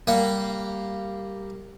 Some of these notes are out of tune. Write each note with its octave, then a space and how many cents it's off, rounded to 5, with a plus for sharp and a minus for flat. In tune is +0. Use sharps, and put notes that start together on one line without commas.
G3 +0 A#3 -10 F#5 +0